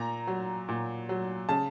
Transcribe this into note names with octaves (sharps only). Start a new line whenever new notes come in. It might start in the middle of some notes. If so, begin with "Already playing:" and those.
Already playing: A#2 A#5
F#3
A#2
F#3
C#3 A5